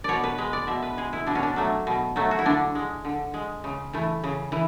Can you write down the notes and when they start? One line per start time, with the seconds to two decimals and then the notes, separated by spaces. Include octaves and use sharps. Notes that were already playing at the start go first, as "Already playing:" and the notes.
0.04 B2 C#5 D5
0.24 B4
0.38 G#3 B4
0.53 D5
0.67 B2 E5
0.82 B4
0.98 G#3 G#4
1.13 E4
1.27 B2 D4
1.35 C#4
1.43 D4
1.56 F#3 A3
1.87 B2
2.16 F#3 A3
2.31 F#4
2.39 E4
2.46 D3 D4
2.75 G#3
3.05 D3
3.34 G#3
3.64 C#3
3.93 E3 A3
4.24 C#3
4.52 E3